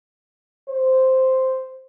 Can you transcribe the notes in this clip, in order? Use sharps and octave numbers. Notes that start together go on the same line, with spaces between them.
C5